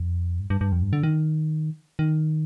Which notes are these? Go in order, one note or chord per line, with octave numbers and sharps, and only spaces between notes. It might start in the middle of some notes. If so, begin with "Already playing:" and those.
Already playing: F2
G2
G2
G2
F2
G2
D3
D#3
D#3